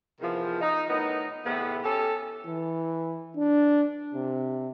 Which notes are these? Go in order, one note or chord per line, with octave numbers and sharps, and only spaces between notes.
E2 C3 D#3 F3
D#4
A2 D#3 B3 D#4
E2 A2 C3 B3
C#4 G4 A4
E3
D4
C3